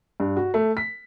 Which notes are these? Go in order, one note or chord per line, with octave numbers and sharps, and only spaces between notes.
G2
F#4
A3
B6